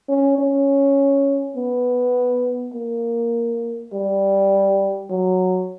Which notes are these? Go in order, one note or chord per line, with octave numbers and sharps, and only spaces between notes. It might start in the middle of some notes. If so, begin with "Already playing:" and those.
C#4
C#4
B3
A#3
G3
F#3